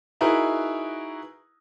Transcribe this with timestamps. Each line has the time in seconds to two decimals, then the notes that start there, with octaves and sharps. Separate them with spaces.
0.21 D#4 E4 F#4 G#4 A#4 B4